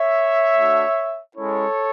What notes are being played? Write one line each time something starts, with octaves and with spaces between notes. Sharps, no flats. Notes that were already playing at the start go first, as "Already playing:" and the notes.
Already playing: C#5 E5
A3 D4 F#4
G#3 C#4 E4 A4 C#5